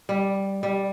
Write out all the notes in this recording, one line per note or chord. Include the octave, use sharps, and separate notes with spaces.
G3
G3